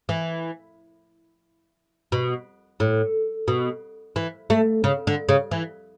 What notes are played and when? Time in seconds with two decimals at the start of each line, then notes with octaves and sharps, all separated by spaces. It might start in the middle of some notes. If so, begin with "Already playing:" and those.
0.09 E3
2.12 B2
2.80 A2
3.48 B2
4.16 E3
4.50 A3
4.84 C#3
5.07 D3
5.29 C#3
5.51 E3